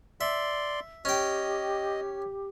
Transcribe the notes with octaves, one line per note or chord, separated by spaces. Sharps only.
D5 E5 C6
C#4 G4 D#5 G5